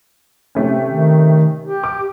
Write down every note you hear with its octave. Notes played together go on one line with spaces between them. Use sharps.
C3 A3 C#4
D#3
G4
D6